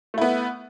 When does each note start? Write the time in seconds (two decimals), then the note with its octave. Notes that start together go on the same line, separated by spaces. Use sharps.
0.14 A3
0.18 E4
0.21 B3